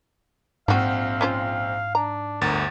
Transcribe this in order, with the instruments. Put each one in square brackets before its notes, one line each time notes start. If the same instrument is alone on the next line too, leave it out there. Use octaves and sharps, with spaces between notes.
[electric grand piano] A#1 C4 [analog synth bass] G#2 [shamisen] F3 F#4 [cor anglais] F5
[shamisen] C#4 F4 C5
[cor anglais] D4 [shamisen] A#5
[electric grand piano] G1 D2 A6 [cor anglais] A#4